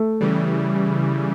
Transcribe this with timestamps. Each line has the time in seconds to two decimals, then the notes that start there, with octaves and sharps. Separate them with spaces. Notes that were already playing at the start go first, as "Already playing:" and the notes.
Already playing: A3
0.21 C#3 E3 G3